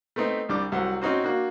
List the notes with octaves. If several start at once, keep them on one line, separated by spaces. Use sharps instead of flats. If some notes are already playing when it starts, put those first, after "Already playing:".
A3 B3 C4 D#4
C2 G3 D4 D6
C2 F#3 C5 F#5
C4 C#4 D#4 F#4 C5
A#3 D4 F#4